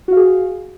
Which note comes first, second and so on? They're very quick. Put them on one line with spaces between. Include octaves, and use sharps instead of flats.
F#4 F5 G#4